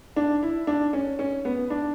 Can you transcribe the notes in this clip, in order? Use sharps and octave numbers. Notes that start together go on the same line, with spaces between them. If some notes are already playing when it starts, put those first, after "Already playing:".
D4
E4
D4
C#4
C#4
B3
D4